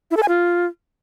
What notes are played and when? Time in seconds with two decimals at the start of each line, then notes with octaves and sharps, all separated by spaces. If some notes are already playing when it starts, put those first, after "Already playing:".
0.11 E4
0.17 A4
0.23 G#5
0.28 F4